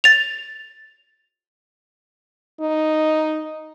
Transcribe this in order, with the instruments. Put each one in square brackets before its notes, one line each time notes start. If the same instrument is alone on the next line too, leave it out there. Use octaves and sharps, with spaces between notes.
[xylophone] A6 F7
[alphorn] D#4